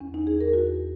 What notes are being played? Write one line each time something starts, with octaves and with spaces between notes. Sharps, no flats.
E2 C#4
D#4
E2
G#4
E2 A#4
E2 F#4